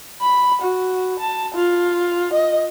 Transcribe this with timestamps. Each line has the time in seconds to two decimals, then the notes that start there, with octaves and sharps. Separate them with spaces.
0.22 B5
0.62 F#4
1.20 A5
1.55 F4
2.33 D#5